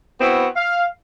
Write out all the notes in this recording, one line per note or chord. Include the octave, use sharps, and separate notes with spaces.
B3 C4 E4 F#4
F5